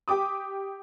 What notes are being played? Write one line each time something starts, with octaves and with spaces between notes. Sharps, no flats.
G4 G5 D6 D#6